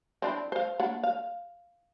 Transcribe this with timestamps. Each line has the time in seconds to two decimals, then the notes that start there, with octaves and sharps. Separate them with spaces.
0.22 C4 D4 E4
0.52 C5 F5
0.80 A#3 D4 F#5
1.03 F5